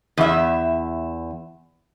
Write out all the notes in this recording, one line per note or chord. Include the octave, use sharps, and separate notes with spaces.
E2 E5